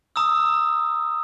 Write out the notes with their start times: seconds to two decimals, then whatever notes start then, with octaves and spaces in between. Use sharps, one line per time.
0.16 A#5 D#6 E6